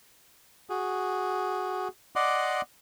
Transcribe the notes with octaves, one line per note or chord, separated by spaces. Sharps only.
F#4 G#4
D5 D#5 F#5 C6 D6